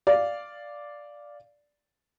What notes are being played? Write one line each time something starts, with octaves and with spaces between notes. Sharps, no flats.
D5 F5